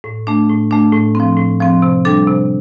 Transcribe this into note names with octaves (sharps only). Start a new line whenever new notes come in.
A2
A3 D4
A2
A3 D4
A2
F3 C4
A2
F3 C4
C3
G3 D4 A4
C3